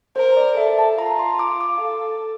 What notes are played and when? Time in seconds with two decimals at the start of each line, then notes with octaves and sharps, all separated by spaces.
0.16 A#4 C5
0.37 D5
0.57 A4 E5
0.79 A5
0.98 F4 A#5
1.19 C6
1.39 D6
1.61 D6
1.81 A4